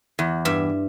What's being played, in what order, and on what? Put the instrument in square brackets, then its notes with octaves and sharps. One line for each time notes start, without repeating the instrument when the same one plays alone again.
[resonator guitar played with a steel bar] E2
[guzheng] G2 E5